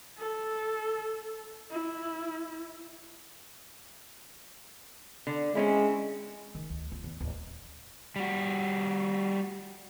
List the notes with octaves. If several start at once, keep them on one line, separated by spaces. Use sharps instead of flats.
A4
E4
D3
G#3 C4 C#4 E4
D#3
D2
F4
E2
D1
G3 F#4